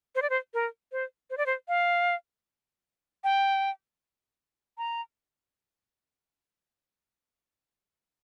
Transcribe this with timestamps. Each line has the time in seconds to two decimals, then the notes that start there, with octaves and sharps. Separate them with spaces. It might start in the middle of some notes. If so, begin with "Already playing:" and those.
0.15 C5
0.22 D5
0.30 C5
0.54 A#4
0.92 C5
1.30 C5
1.37 D5
1.46 C5
1.68 F5
3.24 G5
4.78 A#5